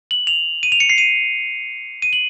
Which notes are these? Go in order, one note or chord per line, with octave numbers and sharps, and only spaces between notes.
F#7
F7
D#7
F7
C#7
C7
D#7
D#7
F#7